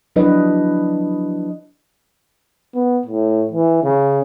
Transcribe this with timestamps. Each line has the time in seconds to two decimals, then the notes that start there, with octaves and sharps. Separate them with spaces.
0.16 F3 F#3 D4 E4 B4 D#5
2.74 B3
3.06 A2
3.52 E3
3.83 C#3